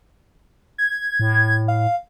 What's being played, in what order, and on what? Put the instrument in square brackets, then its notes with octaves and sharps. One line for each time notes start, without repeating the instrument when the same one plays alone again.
[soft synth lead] G#6
[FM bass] A2
[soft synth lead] F5